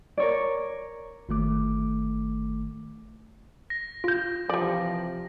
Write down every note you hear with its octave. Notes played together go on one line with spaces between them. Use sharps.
A#4 C#5 D5
G1 D#3 A3 D6
A#6
F4 G6
C3 E3 F3 G3 D5